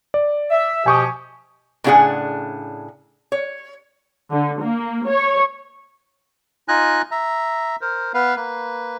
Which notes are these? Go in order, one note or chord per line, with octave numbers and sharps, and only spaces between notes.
D5
E5
B2 F3 G4 G#5 C#6 D#6
A2 C#3 D4 F4 G#4 F#5
C#5
D3
A#3
C#5
D#4 F4 D#5 G#5 F#6
E5 A#5
A#4 C5
B3 B4 F5
A#3 B4